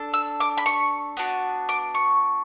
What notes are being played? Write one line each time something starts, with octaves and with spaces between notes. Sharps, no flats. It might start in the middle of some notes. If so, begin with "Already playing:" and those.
Already playing: D4 A4
E6
D6
B5
C#6
B3 D4 F#4
D6
C#6